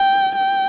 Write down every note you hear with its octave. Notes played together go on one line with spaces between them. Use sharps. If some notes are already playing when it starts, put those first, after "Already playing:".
Already playing: G5
G5